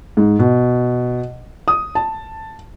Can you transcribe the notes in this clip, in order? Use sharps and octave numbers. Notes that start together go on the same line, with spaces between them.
G#2
B2
D#6
A5